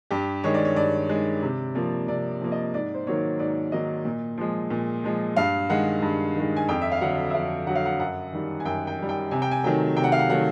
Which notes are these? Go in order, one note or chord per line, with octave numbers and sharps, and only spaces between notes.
G2 G4
D#3 G#3 C#5
D5
C#5
G2 D5
D#3 G#3
C3
F3 A#3
C3 D5
F3 A#3
D#5
G#2 D5
C5
D#3 F#3 A#3 C#5
G#2 D5
D#3 F#3 A#3 D#5
A#2
F3 G#3
A#2
F3 G#3
G2 F5
D#3 G#3 F#5
G2
D#3 G#3
G#5
F2 G5
E5
F5
D3 F#3 F#5
E5
F2 F5
D3 F#3 F#5
F5
F#5
F#2 F#5
D#3 G3
G#5
F#2 G5
G5
D#3 G3
G5
C3 G#5
G5
G#5
D#3 F#3 A3 G5
C3 G5
F#5
F5
F#5
D#3 F#3 A3 F#5